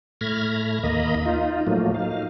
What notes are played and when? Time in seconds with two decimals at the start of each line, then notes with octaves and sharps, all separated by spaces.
0.21 A2 A3 B5 F6 G#6 A#6
0.83 D#2 A#3 D#5 A#5 B5
1.26 D#4 F4
1.67 A2 F3 F#3 A3 A#3
1.95 D#4 F5